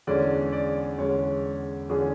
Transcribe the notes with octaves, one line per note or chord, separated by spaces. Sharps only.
E2 D3 G#3 C#4 D5
D5
E2 D3 G#3 C#4 C#5
E2 D3 G#3 C#4 G#4